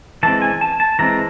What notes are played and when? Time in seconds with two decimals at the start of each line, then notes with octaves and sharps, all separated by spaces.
0.23 E3 G#3 C4 A5
0.42 G#5
0.61 A5
0.80 A5
0.99 E3 G#3 C4 A#5